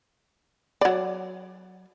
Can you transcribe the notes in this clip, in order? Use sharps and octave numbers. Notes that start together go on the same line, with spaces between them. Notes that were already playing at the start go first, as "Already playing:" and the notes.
F#3 D5